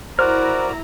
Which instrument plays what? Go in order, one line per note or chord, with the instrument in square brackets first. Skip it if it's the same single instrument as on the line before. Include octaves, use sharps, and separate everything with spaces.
[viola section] E4 A#5 [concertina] F#4 A#4 D5 [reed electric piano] C5 [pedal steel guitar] F6 F#6